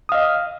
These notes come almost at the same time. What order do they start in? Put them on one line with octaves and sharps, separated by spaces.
D#6 F5 D#5